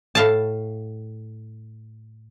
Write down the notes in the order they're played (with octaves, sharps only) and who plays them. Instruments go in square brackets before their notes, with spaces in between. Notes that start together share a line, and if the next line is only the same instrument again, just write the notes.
[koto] A2 F5 A5